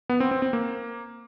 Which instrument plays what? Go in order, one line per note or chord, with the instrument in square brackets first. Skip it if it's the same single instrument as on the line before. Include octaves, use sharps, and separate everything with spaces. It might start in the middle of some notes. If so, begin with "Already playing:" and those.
[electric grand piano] B3
C4
C4
C4
A#3